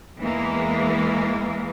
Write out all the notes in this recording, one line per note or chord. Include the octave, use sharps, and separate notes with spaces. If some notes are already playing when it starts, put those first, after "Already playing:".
E2 E3 G#3 A#3